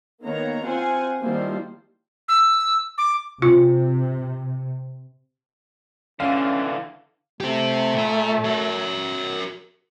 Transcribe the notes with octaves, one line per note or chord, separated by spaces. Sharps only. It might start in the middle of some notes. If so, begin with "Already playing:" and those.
D#3 A#3 B3 C#5 A#5
C4 F4 C5 F#5 G#5
D#3 F3 G3 A#3 E4 C5
E6
D6
C3 F4
D3 E3 C#4 F5
A3 C4 G4
A#2 A#5
F#4 A#4